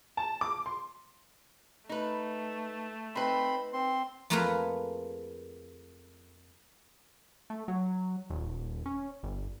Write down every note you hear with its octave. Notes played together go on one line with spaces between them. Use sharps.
A5
D6
C6
A3 D#4 B4
C4 D#4 B4 B5 C6
C4 C6
F2 A3 A#3 F4 G#4 B4
A3
F#3
D#1
C#4
G1